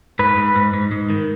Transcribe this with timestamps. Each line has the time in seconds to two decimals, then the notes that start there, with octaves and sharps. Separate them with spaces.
0.19 G#2 B4
0.37 G#2
0.56 G#2
0.74 G#2
0.91 G#2
1.10 D#3